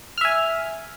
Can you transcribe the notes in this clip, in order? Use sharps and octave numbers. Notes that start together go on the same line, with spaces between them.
E5 G#5 F6